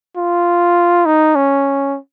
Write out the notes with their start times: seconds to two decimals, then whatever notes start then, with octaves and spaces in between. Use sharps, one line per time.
0.17 F4
1.06 D#4
1.36 C#4